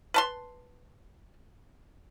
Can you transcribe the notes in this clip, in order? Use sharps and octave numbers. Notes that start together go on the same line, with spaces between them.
B4 A5 C6